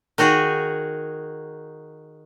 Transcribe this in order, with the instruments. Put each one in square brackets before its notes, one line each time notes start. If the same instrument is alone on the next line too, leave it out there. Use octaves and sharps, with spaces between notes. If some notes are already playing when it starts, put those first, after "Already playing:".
[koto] D#3 D#4 F#4 G#4